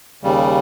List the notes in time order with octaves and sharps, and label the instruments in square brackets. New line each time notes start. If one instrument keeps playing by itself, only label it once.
[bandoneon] D#2 C#3 G3